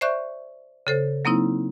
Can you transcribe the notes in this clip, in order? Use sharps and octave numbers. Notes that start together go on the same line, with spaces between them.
C5 D5 E5 C#6 F#6 G6
C#3 A4 C5
F#3 A#3 C4 D#4 E4